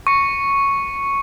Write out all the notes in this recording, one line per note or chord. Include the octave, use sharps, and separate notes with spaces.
C#6 C#7